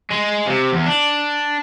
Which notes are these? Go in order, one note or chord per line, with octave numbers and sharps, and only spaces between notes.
G#3
C3
E2
D4